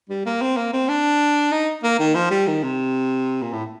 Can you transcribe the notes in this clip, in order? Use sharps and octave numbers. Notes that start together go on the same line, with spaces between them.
G3
A#3
C4
A#3
C4
D4
D#4
A#3
D#3
F3
G3
D#3
C3
A#2
A2